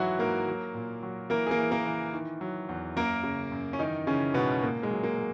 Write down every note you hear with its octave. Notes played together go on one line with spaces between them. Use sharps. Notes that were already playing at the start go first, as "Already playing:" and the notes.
Already playing: G#2 E3 F#3 E4 F#4
G#2 A#3 A#4
F#3
A#2
F#3
E3 A#3 A#4
G#4
A#3 A#4
E3
A#3 A#4
E3
D#3
F#3
E2
F#2 A#3 A#4
C#3
F#2
C#4
D#3 E3 D#4
C#3 E3 C#4
G#2 B2 B3
A#2 A#3
G#3
F#3
A#3
F#3